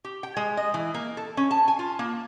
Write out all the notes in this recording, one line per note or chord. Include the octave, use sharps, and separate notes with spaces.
G4
G5
G#3
D#5
E3
A#3
A4
C#4
A5
G#5
F4
A#3